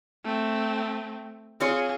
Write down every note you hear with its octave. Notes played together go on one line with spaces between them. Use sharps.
A3 C4
C4 F4 G#4 C#5